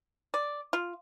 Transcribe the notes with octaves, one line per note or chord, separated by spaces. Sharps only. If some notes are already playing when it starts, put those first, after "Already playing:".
D5
F4